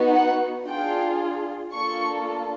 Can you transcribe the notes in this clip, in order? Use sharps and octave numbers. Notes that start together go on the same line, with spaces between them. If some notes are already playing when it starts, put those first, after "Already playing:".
Already playing: B3 D#4 F#4
F#5
D4 F4 G#4 G5
A#3 D4 F4 A4 C#6